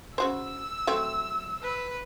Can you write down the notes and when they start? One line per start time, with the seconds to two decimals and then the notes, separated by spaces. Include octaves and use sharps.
0.18 C#3 F#4 C5 E6
0.87 F#3 A3 C4
1.62 B4